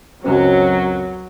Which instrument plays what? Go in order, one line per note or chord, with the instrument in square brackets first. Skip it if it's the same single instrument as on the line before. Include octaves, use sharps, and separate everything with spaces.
[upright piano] C#2 F#2 C4 [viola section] F#3